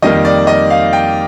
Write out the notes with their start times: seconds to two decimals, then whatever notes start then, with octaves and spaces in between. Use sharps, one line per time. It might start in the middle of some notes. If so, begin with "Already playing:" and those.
0.02 F2 D#3 G3 A#3 D#5
0.25 D5
0.47 D#5
0.70 F5
0.93 G5